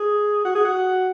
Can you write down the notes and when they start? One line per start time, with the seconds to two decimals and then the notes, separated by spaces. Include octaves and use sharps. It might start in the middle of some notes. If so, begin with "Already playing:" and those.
Already playing: G#4
0.45 F#4
0.55 G#4
0.64 F#4